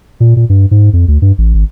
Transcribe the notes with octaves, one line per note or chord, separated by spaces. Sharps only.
A#2
A#2
G2
G#2
F2
D2
G2
A1
G#1